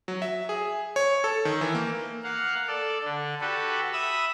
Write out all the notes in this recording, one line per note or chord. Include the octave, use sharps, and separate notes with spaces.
F#3
E5
G#4
C#5
A4
D#3
E3
A#3
A#3 F5 F#5
A4 D5
D3 D4
F#4 G4 A4 B4
E5 B5 D#6 E6